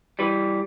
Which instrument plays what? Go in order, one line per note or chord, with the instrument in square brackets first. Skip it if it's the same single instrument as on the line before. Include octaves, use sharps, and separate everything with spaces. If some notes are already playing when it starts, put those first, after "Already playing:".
[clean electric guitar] E3 G3 B4